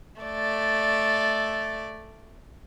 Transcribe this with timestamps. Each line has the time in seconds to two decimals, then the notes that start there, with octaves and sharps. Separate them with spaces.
0.21 A3 D5